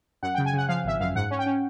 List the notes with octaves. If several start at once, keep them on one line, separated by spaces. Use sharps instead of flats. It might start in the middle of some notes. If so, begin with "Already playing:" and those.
F#2 F#5
C#3 G5
G#5
C#3 F#5
F3 F5
G#1 E5
F#2 F5
G#2 F#5
C#4
G5
C#4